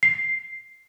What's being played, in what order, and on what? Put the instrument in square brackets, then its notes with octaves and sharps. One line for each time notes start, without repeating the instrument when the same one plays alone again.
[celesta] C7